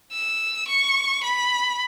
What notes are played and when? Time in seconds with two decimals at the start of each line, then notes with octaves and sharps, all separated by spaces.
0.12 E6
0.67 C#6
1.23 B5